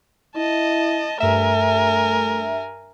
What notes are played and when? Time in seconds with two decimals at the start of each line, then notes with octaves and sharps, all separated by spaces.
0.36 E4 D#5 A5
1.20 G2 A3 A#4 E5 G#5